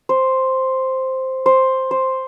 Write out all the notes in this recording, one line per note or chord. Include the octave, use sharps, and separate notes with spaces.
C5
C5
C5